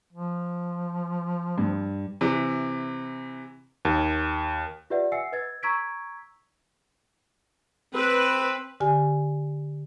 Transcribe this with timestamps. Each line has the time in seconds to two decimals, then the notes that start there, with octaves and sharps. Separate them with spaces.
0.13 F3
1.58 G2
2.21 C3 E3
3.85 D#2
4.90 F4 G4 B4 D5 E5 F#5
5.12 E5 F#5 G#5 E6 C7 C#7
5.32 B4 D#5 E6 G#6 A6
5.63 A#5 C#6 E6 G#6 B6 D7
7.94 C4 B4
8.80 D3 G4 G#5